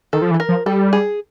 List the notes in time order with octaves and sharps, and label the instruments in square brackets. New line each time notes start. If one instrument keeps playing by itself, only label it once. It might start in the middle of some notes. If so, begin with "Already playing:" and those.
[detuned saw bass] D#3 [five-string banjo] A4
[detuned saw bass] F3
E3
[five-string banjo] A4
A#4
[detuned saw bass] F3
[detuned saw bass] G3 [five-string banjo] A4
[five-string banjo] G#4